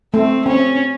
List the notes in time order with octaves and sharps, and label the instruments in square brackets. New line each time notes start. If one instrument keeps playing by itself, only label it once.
[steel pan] A3 [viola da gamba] C4
[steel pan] C4 [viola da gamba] C#4